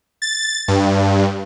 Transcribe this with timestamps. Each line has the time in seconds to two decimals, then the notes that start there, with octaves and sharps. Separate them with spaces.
0.22 A6
0.68 G2